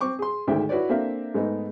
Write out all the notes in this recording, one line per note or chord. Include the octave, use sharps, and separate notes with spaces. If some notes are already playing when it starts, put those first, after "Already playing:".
C4 C#6 D6
G#4 C6
D2 G#2 D#3 G#3 E5 G5
E4 F#4 B4 C#5 D5
A#3 C4 D4 A4 E5 F5
G#2 G#3 A3 B3 D#4